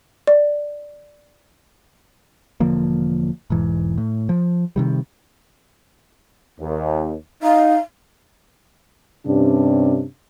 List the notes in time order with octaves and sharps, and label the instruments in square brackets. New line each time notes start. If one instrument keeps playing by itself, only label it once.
[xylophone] D5
[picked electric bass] E1 D3 F3 A#3
E1 G#2 E3
A2
F3
C3 D#3 G3
[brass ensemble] D#2
[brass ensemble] D#4 [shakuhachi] F5
[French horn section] G2 C3 C#4 D4